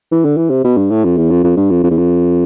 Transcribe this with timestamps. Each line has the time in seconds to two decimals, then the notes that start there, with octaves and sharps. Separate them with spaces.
0.12 E3
0.25 D3
0.37 E3
0.50 C3
0.64 B2
0.77 G2
0.91 A2
1.04 F2
1.17 E2
1.31 F2
1.44 F2
1.57 G2
1.70 F2
1.84 F2
1.90 E2
1.98 F2